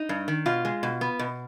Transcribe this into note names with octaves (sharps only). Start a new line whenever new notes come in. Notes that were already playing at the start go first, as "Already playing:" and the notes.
Already playing: D#4
G2
D#3
B2 F4
G#3
B2
B3
B2